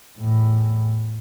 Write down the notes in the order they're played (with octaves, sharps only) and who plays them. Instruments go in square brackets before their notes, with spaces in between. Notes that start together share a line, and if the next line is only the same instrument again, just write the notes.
[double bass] E2 A2